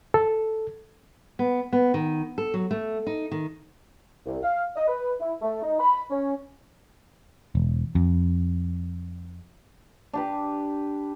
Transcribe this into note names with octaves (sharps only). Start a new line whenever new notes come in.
A4
B3
B3
D#3
A4
F#3
A3
D#4
D#3
C2
F5
D#5
B4
E4
A3
D#4
B5
C#4
E1
F2
D4 G4 B4